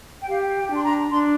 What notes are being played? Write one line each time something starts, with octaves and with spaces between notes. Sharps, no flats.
G5
G4 F5
G5
D4
C6
A#5
D4 C6